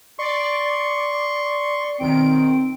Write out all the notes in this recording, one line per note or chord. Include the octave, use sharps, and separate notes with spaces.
D5 C6 C#6
B1 D#3 C4 D7